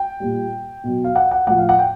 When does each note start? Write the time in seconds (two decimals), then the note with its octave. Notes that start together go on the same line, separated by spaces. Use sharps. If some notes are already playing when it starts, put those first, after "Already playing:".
Already playing: G5
0.20 A#2 G3
0.84 B2 F#3
1.04 F5
1.16 F#5
1.31 F#5
1.47 A2 F3 F#5
1.58 F5
1.69 F#5
1.79 G5